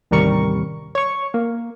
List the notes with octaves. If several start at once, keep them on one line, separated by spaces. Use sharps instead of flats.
A1 D#2 C3 G3 A#4 C#6
C#5 C#6
A#3